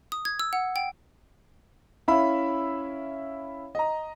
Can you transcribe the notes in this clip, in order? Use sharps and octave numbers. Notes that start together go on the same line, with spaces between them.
D#6
G#6
E6
F#5
G5
C#4 E4 E5 F5 B5
D#5 A#5